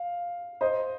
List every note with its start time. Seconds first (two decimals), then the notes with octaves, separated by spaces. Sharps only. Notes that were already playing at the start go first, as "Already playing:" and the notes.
Already playing: F5
0.61 C5 D#5